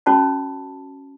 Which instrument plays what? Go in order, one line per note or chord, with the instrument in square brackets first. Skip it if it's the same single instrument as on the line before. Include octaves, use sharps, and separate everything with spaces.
[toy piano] C#4 F#4 C#5 A5 B5